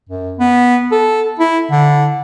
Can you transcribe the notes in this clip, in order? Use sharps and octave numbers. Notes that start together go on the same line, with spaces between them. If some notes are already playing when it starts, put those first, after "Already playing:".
F#2
B3
A4
E4
D3